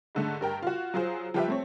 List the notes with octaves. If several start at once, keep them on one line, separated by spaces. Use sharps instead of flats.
G#2 D3 A3
G2 A#4 G5
F4 F#4
F#3 F4 G#4 C5
F3 G3 F4 G4 B4 E5
A3 C4 C#5